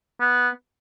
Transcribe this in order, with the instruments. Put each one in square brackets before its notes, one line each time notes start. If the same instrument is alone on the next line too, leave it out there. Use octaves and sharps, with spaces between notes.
[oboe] B3